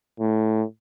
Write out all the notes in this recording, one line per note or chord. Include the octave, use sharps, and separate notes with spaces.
A2